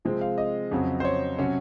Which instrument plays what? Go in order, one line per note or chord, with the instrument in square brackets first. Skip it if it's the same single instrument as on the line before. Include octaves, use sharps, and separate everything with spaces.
[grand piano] C3 F3 G#3 C4
F5
D#5
F2 C#3 F#3 C4
C5
C#5
C3 F#3 C#4